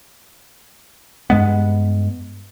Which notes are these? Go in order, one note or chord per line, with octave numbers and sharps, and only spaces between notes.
G2 G#3 B3